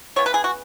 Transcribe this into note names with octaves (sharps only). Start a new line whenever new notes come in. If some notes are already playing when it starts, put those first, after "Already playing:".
C#3 E3 B3 C#5
B4
G#4
F#4